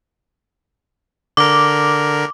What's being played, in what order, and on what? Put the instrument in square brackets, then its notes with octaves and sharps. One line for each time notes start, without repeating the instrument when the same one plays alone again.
[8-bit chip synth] D3 A#4 [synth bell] D6